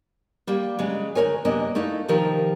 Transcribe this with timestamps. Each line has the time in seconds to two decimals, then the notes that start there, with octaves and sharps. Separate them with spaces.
0.47 G3 A#3
0.79 C#3 F#3 G#3
1.15 D2 G#2 A#4 C#5 G#5
1.45 F#2 C3 A#3 B3 D4 D#5
1.75 A3 A#3 D#4 E4
2.08 C3 D#3 F3 G4 A#4